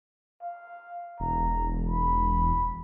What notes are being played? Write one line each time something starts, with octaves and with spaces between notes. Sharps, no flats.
F5
E1 A#5
B5